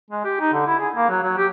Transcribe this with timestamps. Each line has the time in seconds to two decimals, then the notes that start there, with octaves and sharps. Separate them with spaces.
0.10 G#3
0.25 G4
0.40 D#4
0.53 D3
0.67 E4
0.79 G#4
0.95 A#3
1.09 F#3
1.23 F#3
1.37 G4